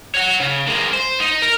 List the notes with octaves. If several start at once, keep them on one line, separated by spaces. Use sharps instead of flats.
C#5 F#5
C#3
G#3 A#3
C5
D#4
A#4